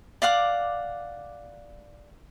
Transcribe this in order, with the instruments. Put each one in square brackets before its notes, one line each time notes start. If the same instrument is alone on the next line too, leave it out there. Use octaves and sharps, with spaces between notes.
[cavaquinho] D5 F5 F#5 D6